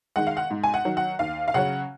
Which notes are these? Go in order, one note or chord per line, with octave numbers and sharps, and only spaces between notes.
D#3 G#3 F#5
F5
F#5
G#2
G#5
F#5
D#3 F#3
F#5
D#2 F5
F5
C#3 F#3 C#4 F#5